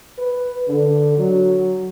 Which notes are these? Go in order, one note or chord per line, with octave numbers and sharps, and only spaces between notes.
B4
D3
F#3